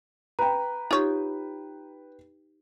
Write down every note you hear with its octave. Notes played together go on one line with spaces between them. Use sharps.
B4 G5 A#5
D#4 F4 G4 C#5